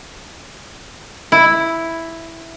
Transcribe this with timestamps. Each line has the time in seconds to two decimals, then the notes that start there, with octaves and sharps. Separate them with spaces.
1.32 E4